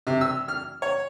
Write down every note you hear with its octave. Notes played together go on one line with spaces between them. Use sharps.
C3
E6
F6
C#5